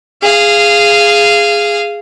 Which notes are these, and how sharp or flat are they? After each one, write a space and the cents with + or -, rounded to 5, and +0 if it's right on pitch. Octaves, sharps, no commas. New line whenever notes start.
G#4 -5 F5 -15